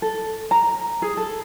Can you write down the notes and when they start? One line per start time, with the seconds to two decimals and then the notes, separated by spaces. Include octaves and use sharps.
0.02 A4
0.51 A#5
1.02 G#4
1.17 A4